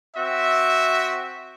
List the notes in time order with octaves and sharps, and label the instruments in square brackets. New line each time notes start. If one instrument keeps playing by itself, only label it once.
[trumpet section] C4 F#4 E5